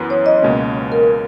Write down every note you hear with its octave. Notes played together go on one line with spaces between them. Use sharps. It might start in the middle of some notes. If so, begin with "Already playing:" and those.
Already playing: F#2 E3 B3
C#5
D#5
C#2 B2 A#3 C#4
A#4